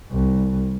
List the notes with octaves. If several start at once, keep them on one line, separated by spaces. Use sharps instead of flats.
C2